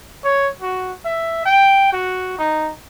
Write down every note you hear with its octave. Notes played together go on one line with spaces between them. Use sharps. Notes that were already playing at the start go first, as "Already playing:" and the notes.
C#5
F#4
E5
G5
F#4
D#4